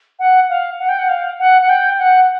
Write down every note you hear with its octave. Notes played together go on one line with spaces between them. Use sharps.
F#5
F5
F#5
G5
F#5
F5
F#5
F#5
G5
F#5